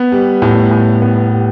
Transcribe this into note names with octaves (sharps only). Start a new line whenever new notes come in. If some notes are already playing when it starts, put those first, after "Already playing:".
Already playing: B3
G3
A2
A2
B3
G3